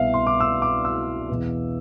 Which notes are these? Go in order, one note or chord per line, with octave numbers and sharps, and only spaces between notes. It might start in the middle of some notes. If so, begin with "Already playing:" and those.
Already playing: C2 B2 B3 E5 F5
C6
D6
E6
D6
E6
E2 B2 B3